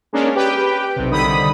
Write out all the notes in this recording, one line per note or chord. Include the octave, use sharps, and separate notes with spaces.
G#3 A#3 C#4 D4
G4 B4 G5
B1 C3
C2 D3 D#3 B5 D#6